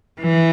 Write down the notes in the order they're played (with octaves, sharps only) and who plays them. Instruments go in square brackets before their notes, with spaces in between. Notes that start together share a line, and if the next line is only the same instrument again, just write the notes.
[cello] E3